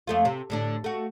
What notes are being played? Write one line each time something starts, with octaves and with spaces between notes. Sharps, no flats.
F2 A3 F4
C3
A2 D3 D4
A3 F#4